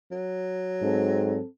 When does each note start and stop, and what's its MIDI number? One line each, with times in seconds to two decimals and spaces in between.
0.11 1.42 54
0.82 1.38 44
0.82 1.45 60
0.82 1.45 69